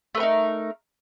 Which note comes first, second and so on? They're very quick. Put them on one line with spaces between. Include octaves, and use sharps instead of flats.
A3 B4 A#4 D#4